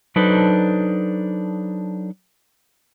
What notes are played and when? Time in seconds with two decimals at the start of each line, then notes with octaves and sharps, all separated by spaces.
0.16 F#3 D4 D#4 A4 B4 C5